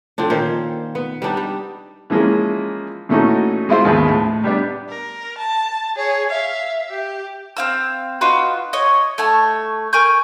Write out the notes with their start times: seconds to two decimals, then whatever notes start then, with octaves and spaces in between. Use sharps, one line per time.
0.18 D3 F3 C4 D4
0.30 A#2 D#3 C#4 C5
0.95 B3
1.22 G3 B3 D4 D#4
1.37 G3
2.10 E3 F3 G#3 A#3 C#4
3.09 A#2 E3 A3 C#4 D#4 F#4
3.69 G#3 E4 F4 C5
3.84 G#1 D#2 F3 B3 G#4 B4
4.09 A2
4.44 G3 B3 D4
4.89 A#4
5.39 A5
5.97 G#4 C#5
6.30 E5 F5
6.91 G4
7.57 C4 F5 E6
8.21 D#4 F4 F#4 B4
8.73 C#5 D#5
9.18 A3 C#5 A5
9.93 A#4 G#5 C#6 G6